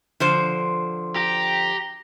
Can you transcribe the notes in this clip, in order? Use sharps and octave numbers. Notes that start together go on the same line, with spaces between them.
D3 F3 C5
G4 A#5